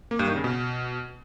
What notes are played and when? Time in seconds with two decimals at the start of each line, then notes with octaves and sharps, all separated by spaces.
0.11 A#3
0.19 G2
0.28 D#3
0.36 C#3
0.44 B2